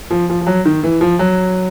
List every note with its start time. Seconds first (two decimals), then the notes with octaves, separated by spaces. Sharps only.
0.11 F3
0.30 F3
0.41 F3
0.47 F#3
0.66 D#3
0.83 E3
1.01 F3
1.19 F#3